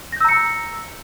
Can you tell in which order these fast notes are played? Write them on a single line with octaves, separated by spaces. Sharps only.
A#6 G6 E6 A#5 C#7